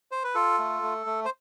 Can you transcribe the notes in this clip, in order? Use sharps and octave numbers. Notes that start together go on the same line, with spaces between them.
C5
B4
F4 A4
A3
A3
A3
C5